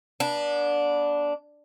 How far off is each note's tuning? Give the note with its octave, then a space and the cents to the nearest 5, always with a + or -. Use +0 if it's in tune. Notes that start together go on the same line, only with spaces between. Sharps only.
B3 -40 D4 -10